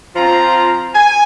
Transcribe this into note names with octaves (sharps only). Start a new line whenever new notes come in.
F3 C4 F4 A#5
G#5